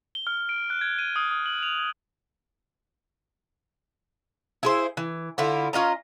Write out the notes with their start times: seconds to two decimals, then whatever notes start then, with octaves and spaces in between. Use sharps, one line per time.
0.15 G7
0.27 F6
0.49 D7
0.70 F#6
0.81 G#6
0.99 D#7
1.16 D#6
1.31 D#6
1.46 F#7
1.63 F7
1.79 G#6
4.63 E4 G#4 C5
4.97 E3
5.38 D3 E4 F4
5.73 C#4 F4 D#5 A#5